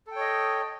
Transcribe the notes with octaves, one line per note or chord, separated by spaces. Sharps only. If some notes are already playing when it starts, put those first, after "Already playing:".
A4 C#5 D#5 G5